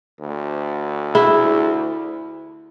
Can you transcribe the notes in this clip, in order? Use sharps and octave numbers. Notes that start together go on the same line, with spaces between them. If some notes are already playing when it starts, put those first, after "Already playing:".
D2
E4 G#4